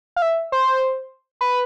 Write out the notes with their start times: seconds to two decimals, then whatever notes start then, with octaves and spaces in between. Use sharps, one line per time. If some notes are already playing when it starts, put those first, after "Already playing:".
0.16 F5
0.22 E5
0.52 C5
1.41 B4